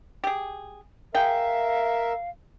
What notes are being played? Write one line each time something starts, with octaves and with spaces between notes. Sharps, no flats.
G4 G#4
G#4 A#4 E5 F5 G5